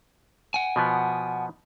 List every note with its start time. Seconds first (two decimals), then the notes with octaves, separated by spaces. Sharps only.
0.54 F#5 G#5
0.76 B2 F3 B3